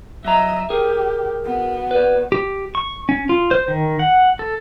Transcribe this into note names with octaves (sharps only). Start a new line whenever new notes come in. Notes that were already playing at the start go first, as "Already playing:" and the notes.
F#3 D#5 E5 A#5
G4 G#4 A#4
B3 F#4
B4 D5
G4
C#6
C#4
F4
C5
D#3
F#5
A4